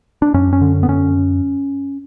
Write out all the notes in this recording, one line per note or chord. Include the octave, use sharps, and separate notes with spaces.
D4
F#2 C#4
C#4
D3
B3
F#2 C#4